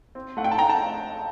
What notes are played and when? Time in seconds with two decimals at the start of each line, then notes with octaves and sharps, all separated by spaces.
0.15 C4
0.37 A3 F#5
0.44 G5
0.52 A5
0.58 A3 G5 A#5
0.69 A5